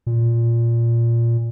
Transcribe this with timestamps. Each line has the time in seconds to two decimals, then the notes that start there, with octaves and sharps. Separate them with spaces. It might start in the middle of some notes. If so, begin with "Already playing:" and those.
0.07 A#2